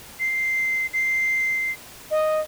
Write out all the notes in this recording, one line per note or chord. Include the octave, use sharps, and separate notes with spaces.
C7
C7
D#5